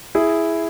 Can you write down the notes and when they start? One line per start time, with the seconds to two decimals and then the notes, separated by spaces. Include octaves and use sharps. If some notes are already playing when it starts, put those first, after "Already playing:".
0.15 E4 G#4